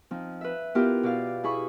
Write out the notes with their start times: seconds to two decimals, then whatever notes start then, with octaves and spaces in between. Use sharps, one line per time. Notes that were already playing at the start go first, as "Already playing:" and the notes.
0.11 F3 C4 D#4
0.41 B4 E5
0.75 B3 E4 F4 G4 A#4
1.03 B2 D5 F5
1.44 E4 G#4 B5 C#6